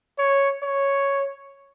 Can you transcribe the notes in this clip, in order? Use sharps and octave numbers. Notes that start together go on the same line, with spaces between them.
C#5
C#5